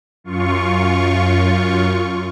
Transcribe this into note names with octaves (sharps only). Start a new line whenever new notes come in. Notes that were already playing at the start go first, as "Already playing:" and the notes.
F#2 F4 C#6